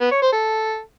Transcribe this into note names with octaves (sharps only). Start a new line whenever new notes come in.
B3
C#5
C5
A4